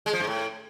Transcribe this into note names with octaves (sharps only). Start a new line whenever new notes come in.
G#3
F3
G#2
A2